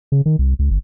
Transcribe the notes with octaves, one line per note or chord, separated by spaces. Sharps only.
C#3
D#3
C2
C#2
G1